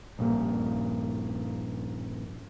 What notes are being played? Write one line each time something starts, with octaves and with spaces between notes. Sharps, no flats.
A#1 G2 A#3